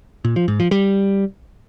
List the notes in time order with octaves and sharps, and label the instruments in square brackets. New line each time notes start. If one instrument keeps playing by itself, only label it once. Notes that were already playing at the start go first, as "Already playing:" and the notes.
[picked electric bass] A#2
F3
G#2
F3
G3